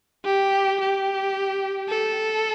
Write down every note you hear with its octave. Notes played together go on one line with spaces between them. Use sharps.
G4
G4
A4